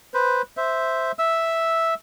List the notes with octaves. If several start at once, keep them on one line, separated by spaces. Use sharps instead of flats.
B4 C5
C5 E5
E5 E6